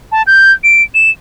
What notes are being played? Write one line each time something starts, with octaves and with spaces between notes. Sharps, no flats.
A5
G6
D7
E7